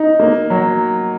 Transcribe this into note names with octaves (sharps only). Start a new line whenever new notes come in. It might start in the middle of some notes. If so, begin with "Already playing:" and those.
Already playing: D#4
A#3
F#3